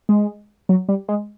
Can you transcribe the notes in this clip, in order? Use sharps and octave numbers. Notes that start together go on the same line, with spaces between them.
G#3
F#3
G3
G#3